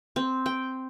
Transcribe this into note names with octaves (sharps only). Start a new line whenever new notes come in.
C4
G5